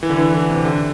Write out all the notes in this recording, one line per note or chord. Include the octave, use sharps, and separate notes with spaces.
E3
D3
E3
E3
C3
D3